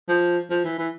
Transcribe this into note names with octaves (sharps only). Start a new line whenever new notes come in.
F3
F3
E3
E3